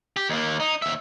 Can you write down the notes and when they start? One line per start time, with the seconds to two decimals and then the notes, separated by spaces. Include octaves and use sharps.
0.17 G4
0.29 D#2 A#3
0.60 D#4
0.82 D#2 E5